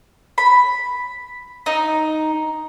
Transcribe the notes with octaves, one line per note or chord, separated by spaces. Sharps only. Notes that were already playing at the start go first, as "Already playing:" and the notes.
B5
D#4